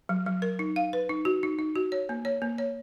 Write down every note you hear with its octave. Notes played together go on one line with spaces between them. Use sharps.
F#3
F#3
A#4
D#4
F5
B4
D#4
F#4
D#4
D#4
F#4
C#5
A#3
C#5
A#3
C#5